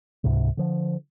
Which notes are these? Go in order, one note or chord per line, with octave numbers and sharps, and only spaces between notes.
C#2 G#2 C3
D3 F3